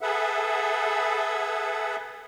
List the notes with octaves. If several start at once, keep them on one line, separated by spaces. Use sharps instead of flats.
G#4 A4 B4 E5 F#5